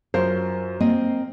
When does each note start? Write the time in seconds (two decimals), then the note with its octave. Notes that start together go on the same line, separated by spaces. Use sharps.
0.14 F#2 C#4 F4 A#4 C5
0.80 A#3 C4 D#5